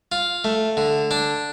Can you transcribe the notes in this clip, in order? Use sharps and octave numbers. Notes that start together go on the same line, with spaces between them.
F4
A3
D3
D4